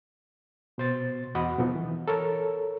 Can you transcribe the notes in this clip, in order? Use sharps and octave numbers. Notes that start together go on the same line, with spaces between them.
B2 C5 A6
E2 F#4 D#5 F#5 B5
B2 F3 B3 D#4
E3
A4 A#4 C#5